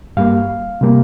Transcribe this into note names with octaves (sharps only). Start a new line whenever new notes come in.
G2 G3 A#3 F5
C3 G3 A#3